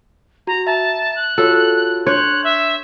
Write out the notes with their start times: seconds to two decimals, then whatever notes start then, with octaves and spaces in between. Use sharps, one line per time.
0.47 F#4 A#5
0.67 E5 A5 A#5
1.16 F#6
1.38 F4 F#4 A4 C#5
2.07 D4 C#5 C6 F#6 G6
2.44 E5